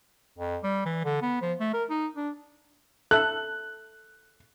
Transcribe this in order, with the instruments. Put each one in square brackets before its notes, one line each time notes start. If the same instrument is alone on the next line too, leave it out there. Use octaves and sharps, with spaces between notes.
[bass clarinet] F2
G3
E3
D3
B3
F3
A3
A#4
D#4
D4
[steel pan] A4 E5 [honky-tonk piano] F#6